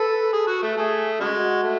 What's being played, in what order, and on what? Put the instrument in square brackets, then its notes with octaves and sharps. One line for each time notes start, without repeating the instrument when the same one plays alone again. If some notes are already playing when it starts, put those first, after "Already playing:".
Already playing: [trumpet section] A4 [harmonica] B4
[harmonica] G#4
F#4
A3
[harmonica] A3 [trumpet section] G#4
[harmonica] C#3 G#3 [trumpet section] F#4
[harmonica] A3